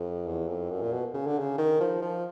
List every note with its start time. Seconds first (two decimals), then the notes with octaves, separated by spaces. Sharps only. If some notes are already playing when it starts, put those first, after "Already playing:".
Already playing: F2
0.27 E2
0.48 F2
0.71 F#2
0.82 A#2
0.93 B2
1.14 C#3
1.27 D3
1.39 C#3
1.58 D#3
1.80 F3
2.02 F3